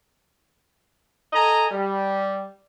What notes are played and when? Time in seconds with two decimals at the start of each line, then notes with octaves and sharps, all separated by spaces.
1.33 A4 D#5 G#5 A#5
1.71 G3